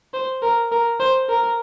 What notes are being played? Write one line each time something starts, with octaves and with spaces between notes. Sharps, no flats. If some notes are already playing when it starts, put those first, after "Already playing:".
C5
A#4
A#4
C5
A#4